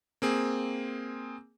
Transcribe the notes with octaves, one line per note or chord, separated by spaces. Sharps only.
A#3 C4 G#4